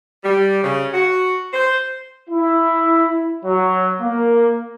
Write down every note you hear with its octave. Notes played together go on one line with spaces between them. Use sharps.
G3
C#3
F#4
C5
E4
F#3
A#3